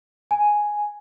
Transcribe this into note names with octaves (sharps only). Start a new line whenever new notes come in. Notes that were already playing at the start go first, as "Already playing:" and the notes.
G#5